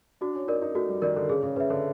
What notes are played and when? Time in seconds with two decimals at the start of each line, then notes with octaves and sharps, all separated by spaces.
0.21 D4 F#4
0.35 C#4
0.48 D#4 A#4 D5
0.62 D#4
0.75 A3 F#4
0.89 G3
1.02 D#3 A#4 D5
1.16 D3
1.29 C#3 G#4
1.43 C#3
1.56 C#3 B4 E5
1.70 D3